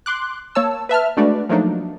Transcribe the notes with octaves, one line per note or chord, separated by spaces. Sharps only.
C6 D6 F#6
A#3 C#5 A5 E6
B4 E5 A5 F6
G#3 A3 D4 F#4 B4 D5
F3 F#3 A3 A#3 D4 D#4